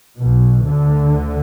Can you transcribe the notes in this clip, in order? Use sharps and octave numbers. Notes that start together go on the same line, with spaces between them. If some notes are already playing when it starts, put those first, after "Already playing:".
B1 B2
D2 D3